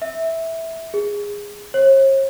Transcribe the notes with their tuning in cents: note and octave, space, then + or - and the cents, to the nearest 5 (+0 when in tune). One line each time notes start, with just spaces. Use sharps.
E5 -10
G#4 -15
C#5 -45